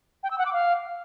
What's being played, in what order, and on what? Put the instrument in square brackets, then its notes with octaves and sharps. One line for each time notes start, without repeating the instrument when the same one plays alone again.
[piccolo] G5
E6
F#5
D6
F5